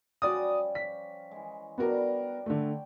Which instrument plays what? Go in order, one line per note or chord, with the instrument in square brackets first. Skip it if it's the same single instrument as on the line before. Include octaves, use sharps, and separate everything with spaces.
[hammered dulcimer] F3 G3 C#4 [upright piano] F#4 D5 D#6
[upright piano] B6
[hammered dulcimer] E3 G#3
[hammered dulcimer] G3 D4 [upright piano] B3 F#4 A#4
[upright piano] D3 A3 [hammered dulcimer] G5 C#6